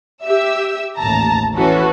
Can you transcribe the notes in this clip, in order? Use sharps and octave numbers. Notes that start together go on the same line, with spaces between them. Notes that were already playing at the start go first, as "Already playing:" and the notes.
G4 E5 E6
A1 D#2 A5 A#5
E3 C#4 F#4 A4 B4